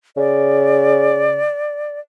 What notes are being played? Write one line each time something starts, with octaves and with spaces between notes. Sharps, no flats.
C#3 D5